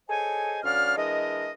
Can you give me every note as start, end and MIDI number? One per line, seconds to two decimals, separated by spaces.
0.09 0.60 68
0.09 0.60 69
0.09 0.60 72
0.09 0.60 73
0.09 0.60 75
0.09 0.60 80
0.64 0.95 38
0.64 0.95 54
0.64 0.95 61
0.64 0.95 74
0.64 0.95 77
0.64 0.95 89
0.97 1.52 52
0.97 1.52 56
0.97 1.52 62
0.97 1.52 70
0.97 1.52 75